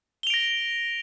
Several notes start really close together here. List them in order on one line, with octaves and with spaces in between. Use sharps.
G7 F7 D7 A#6